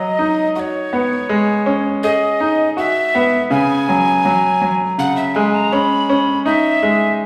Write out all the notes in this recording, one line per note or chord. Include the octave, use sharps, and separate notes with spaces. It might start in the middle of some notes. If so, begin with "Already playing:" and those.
Already playing: F#3 D#5
D#4
F#4 C#5 D#5
B3
G#3
C#4
G#4 D#5
D#4
F#4 E5
B3
C#3 G#5
F#3
F#3
F#3
C#3 F#5
E5
G#3 G#5
A#5
C#4 B5
C#4
D#4 E5
G#3